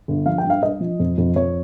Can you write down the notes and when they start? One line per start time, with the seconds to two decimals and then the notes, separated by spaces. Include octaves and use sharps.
0.08 G1
0.26 F3 F5
0.38 G5
0.44 G2
0.50 F5
0.62 G2 D#5
0.81 F3
1.00 F2
1.18 F2
1.36 F2 C#5